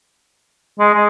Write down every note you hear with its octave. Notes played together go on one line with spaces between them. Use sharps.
G#3
G#3